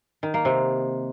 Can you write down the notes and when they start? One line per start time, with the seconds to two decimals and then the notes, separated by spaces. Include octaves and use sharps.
0.23 D#3
0.34 A#3
0.45 C3